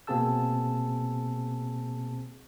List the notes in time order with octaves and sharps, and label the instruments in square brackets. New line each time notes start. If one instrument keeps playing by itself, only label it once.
[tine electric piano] B2 A#3 C4 G#4 A5 E6